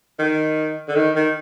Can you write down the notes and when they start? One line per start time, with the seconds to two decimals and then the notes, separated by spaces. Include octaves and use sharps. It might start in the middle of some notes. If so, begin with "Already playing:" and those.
0.19 D#3
0.88 D3
0.95 D#3
1.15 D#3